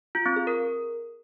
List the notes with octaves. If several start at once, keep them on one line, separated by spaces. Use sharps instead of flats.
F4
C4
G#4
A#4